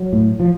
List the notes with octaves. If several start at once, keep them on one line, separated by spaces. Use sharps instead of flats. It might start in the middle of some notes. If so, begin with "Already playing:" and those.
Already playing: F#3
A2
F3